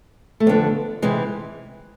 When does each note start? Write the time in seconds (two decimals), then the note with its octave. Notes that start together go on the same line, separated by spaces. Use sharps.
0.40 A3
0.46 F2 D3 B3
1.02 C3 E3 G#3